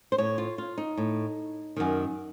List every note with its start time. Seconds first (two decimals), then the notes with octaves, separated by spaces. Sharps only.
0.12 C5
0.18 A2 C#5
0.38 F4
0.58 F4
0.78 D#4
0.97 A2
1.76 F#2 D#3